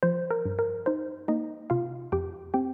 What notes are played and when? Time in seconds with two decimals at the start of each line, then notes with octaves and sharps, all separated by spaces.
0.03 F3 C5
0.31 A#4
0.45 G2
0.59 A#4
0.86 D#4 C5
1.28 A#3 D#4 D#5
1.70 C3 F4 F5
2.12 F2 G4 G5
2.54 C4 G4 G5